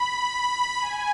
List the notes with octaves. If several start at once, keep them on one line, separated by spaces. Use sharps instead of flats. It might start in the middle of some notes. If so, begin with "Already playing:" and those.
Already playing: B5
G#5